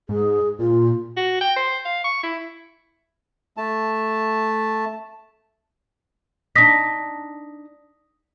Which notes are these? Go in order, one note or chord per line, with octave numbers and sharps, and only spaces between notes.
G#2 G#4
A#2 F4
F#4
G5
C5
F5
C#6
E4
A3 A5
D4 D#4 D#6 A#6 B6